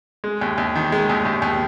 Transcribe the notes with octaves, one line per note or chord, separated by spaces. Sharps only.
G#3
D#2
D#2
D#3
G#3
D#2
D#2
D#2